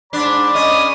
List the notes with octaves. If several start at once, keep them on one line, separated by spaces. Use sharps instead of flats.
G#2 D4 D5 B5
C#4 D#5 D#6